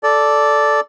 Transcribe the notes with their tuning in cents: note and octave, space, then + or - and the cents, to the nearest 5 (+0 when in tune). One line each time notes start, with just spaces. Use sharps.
A4 -5 D5 -5